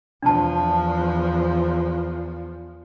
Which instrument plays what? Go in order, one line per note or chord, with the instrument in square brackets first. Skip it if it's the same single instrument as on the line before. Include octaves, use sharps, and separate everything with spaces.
[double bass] E2 F3 [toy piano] D4 A5